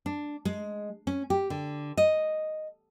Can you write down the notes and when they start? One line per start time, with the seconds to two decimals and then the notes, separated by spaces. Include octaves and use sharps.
0.06 D4
0.45 G#3
1.07 C#4
1.30 G4
1.50 D3
1.97 D#5